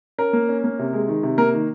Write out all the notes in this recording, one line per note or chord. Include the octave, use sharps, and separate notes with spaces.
C#4 A#4
A#3
C#4
A#3
C3
G#3
D#3
C3
A#3 A#4
D#3